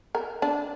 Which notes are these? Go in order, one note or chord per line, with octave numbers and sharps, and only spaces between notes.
A#4
D4